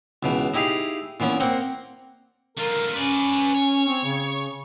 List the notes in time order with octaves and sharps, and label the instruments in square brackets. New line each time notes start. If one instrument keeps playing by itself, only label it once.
[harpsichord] C#2 B2 E3
D#4 E4 G4 G#4 F5
A#2 E3 B3 C#4
A#3 C4 F#5 G5
[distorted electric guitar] D3 F4 [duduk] A#4
[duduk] C#4 [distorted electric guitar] B4 D5
[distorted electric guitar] C#5
[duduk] C4
C#3